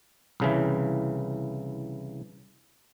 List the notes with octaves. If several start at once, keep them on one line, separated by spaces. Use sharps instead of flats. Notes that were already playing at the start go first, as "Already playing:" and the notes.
C2 C#3 E3